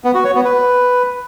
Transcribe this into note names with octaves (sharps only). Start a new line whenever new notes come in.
B3
F#4
C#5
B3
B4